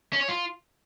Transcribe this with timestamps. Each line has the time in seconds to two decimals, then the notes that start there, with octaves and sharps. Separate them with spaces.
0.13 C#4
0.21 C#5
0.29 F4